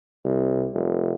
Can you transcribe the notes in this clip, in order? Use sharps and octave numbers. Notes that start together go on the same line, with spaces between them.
C2
F1